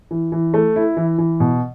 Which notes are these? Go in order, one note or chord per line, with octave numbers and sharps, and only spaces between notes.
E3
E3
A3
E4
E3
E3
B2